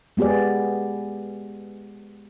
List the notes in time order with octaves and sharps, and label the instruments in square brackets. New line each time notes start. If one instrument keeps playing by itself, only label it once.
[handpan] G#3 B3 G4 G#4 D5